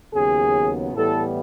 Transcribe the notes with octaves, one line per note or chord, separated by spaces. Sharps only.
D#2 C#3 F#3 B3 G#4
A2 E3 G3 B3 A4